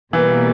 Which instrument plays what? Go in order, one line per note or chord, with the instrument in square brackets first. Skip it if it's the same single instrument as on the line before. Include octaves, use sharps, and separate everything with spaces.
[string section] B2 G3 A#3 [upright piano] E3